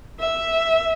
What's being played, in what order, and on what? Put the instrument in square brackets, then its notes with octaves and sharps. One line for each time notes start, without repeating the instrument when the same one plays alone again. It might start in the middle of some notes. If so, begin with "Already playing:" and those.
[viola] E5